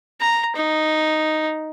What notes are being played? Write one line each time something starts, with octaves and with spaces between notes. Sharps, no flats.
A#5
D#4